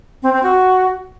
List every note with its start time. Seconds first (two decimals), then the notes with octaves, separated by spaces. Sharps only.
0.23 C4
0.33 C4
0.43 F#4